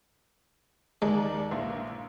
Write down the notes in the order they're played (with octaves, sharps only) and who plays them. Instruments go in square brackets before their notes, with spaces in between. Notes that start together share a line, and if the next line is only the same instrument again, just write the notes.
[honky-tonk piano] D#2 A#4 D5 [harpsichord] G#3
[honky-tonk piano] A#1 A#3 E4